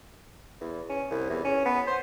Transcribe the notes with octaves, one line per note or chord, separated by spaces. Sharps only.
E2
C#4
C2
E2
C#4
B3
C5